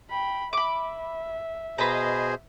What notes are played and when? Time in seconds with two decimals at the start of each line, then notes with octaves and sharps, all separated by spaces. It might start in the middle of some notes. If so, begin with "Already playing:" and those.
0.10 G5 B5
0.53 E5 B5 D6
1.78 B2 G#4 B4 C5 D#5 A#5